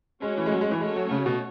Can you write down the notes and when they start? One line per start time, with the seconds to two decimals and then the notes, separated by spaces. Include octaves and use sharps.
0.22 G#3 A3 C#4 F#4 C#5
0.37 E3
0.46 G#3
0.52 F#3
0.61 G#3
0.71 E3
0.81 G#3 A3 C#4 F#4 C#5
0.96 F#3
1.11 C#3
1.26 B2